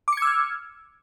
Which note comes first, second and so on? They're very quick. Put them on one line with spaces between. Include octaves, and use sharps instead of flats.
D6 C#7 G#6 E6 F6